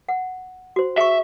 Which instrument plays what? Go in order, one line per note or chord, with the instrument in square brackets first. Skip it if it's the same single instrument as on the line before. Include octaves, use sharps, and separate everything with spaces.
[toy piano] F#5
F#4 C5
[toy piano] G#4 C#6 [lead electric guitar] E5